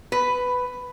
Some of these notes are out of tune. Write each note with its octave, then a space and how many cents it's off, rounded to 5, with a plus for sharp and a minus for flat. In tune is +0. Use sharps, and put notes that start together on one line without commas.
B4 +10